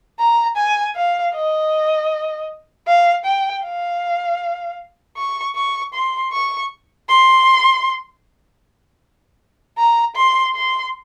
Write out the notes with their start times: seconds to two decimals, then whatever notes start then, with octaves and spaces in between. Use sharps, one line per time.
0.19 A#5
0.57 G#5
0.96 F5
1.34 D#5
2.88 F5
3.25 G5
3.64 F5
5.17 C#6
5.56 C#6
5.94 C6
6.33 C#6
7.09 C6
9.78 A#5
10.16 C6
10.55 C6